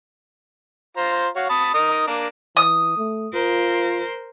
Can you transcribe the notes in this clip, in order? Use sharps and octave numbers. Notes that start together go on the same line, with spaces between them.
F4 C5 A#5
F#4 C#5 F5
A5 B5 D#6
D#4 A#4 D#6
A#3 D4 A#4
E3 D#6
A3
F4 A#4 C5